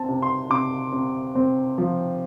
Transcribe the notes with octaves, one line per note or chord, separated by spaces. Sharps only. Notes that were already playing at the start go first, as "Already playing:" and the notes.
Already playing: C4 A5
C3
C6
C3 D6
C3
C4
F3